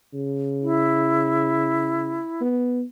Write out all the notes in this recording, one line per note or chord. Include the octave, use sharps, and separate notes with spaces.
C#3
E4
B3